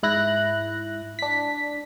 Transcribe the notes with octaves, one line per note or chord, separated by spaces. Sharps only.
G#2 E4 F#6 A#6
D4 B6